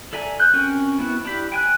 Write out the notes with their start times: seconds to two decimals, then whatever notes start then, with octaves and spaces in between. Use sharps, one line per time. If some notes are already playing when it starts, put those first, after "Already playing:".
0.13 A4 D5 E5 G#5 A#5
0.40 F#6 G6
0.54 C4 C#4 F#4 A#4 G#5
0.98 B3 C4 E4 F#4
1.25 D4 E4 G4 B5
1.52 G5 G#5 F#6